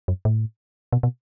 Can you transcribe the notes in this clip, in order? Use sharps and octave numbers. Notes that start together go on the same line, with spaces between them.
F#2
A2
B2
B2